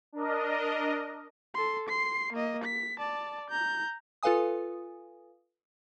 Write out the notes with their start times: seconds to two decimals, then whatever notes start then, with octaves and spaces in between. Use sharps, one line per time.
0.13 D4 A#4 D#5
1.54 A4 C6
1.89 C6 C7
2.33 A#3 D#5
2.64 B6
2.99 D5 A5
3.50 A#5 G6
4.23 F4 A4 B4 F5 G#5 D#6